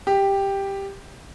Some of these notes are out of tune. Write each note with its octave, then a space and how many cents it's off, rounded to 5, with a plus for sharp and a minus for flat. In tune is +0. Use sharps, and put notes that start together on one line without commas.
G4 +5